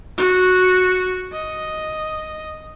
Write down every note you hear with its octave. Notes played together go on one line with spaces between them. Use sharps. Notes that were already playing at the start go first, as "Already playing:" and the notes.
F#4
D#5